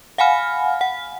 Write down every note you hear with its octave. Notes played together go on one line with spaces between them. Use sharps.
F5 F#5 G#5 B5 F6
F#5